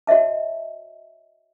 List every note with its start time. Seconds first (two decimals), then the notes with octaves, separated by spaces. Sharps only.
0.07 F#4 C#5 D#5 E5 A5